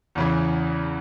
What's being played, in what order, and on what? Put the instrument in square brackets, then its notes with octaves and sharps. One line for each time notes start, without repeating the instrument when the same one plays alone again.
[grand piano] E2 C#3 E3